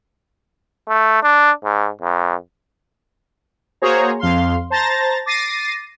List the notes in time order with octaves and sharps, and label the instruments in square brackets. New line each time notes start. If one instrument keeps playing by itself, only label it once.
[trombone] A3
D4
G#2
F2
[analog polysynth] A#3 F#4 G#4 C5 C#5 A#5
F2 F5 C6
C5 A5 A#5 A6 A#6
D6 A6 A#6 C7 D#7